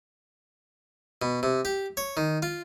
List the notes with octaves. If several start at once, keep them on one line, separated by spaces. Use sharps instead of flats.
B2
C3
G4
C#5
D#3
F4